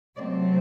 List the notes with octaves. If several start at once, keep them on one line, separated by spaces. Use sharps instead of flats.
C3 F#3 A3 C4 D5